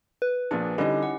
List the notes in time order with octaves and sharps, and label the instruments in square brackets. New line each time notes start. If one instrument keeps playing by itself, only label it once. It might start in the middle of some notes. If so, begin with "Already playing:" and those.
[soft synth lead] B4
[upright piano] A#1 [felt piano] A#2 D4 [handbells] G#4
[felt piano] D3 G3 D#5 [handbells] C#4 E4 G4 [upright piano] D#4
[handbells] F#5